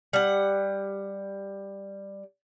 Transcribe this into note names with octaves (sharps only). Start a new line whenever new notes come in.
G3 F#5